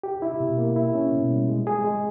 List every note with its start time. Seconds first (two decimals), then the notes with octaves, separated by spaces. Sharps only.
0.03 G4
0.22 E4
0.40 B2
0.58 A#3
0.76 E4
0.94 C#4
1.12 B2
1.31 G3
1.49 G#3
1.67 G#4
1.85 G#3